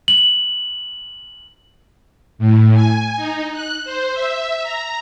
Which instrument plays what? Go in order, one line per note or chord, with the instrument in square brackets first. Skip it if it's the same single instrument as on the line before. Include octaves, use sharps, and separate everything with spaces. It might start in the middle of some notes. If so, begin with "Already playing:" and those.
[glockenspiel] F#7
[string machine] A2
G#5
D#4
F#6
C5
E5
A#5